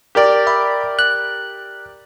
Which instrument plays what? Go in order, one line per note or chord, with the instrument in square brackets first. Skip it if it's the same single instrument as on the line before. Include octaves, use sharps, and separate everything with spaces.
[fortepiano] G4 A#4 D5
[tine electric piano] E5 B5
F#6